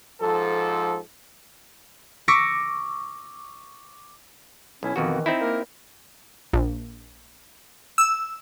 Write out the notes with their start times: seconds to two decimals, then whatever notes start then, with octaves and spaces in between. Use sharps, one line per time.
0.21 G#2 F3 A4
2.28 C#6 D6 E6 A#6 B6 C#7
4.83 B1 C#4 E4
4.96 F2 B2 D#3 E3 F#4
5.26 C4 D#4 E4
5.40 A#3 A#4
6.53 A#1
7.98 E6